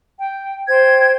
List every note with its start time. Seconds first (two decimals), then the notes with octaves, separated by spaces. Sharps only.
0.20 G5
0.69 C5 G5 G#6